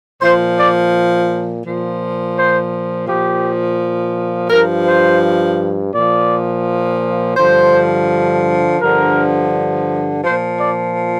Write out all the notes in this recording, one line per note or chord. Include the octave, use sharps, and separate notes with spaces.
A#2 F3 C5
D5
A#2 F3
C5
A#2 F3 G4
G2 F3 A#4
C5
A#2 F3 D5
G2 D3 F3 C5
G2 D3 F3 A#4
A#2 F3 C5
D5